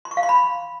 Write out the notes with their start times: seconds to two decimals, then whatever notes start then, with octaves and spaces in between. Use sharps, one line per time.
0.05 C6
0.11 C#6
0.17 F5
0.23 C6
0.29 B5